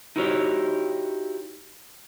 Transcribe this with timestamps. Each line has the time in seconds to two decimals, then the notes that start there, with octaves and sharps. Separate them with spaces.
0.16 D#4 E4 F#4 G4 A#4 C#5